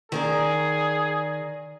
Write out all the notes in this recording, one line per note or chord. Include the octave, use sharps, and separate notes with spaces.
D#3 G#4 A#4 D5